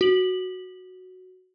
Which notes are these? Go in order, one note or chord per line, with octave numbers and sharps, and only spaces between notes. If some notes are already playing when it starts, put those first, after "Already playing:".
F#4 F#7